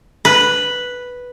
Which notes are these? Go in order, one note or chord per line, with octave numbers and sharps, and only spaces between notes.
B4